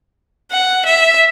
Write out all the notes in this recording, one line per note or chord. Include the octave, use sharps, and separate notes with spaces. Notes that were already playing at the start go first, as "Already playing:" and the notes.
F#5
E5